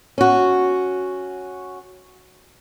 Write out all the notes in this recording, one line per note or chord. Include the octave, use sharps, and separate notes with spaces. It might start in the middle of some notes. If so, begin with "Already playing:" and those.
C#4 F#4